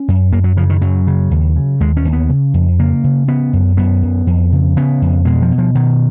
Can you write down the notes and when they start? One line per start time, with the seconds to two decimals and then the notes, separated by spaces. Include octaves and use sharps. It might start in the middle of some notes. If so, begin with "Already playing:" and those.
Already playing: C#4
0.08 F#2
0.32 F#2 A#3
0.44 F#3
0.57 C#3 F3
0.70 D#3
0.81 F#2 F#3
1.07 C#3
1.31 D#2
1.56 C#3
1.80 D#2 G#3
1.97 C#4
2.05 D#2
2.13 B3
2.30 C#3
2.54 F2
2.79 C#3 A#3
3.04 C#3
3.28 C#3 B3
3.53 F#2
3.77 F#2 B3
4.03 F#2
4.27 F2
4.52 C#3
4.77 C#3 B3
5.02 F2
5.25 B2 G#3
5.42 F3
5.51 B2
5.58 F3
5.75 B2 D#3